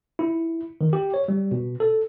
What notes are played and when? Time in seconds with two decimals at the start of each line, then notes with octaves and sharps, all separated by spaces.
0.19 E4
0.81 D#3
0.93 G4
1.14 C#5
1.28 G3
1.51 B2
1.80 A4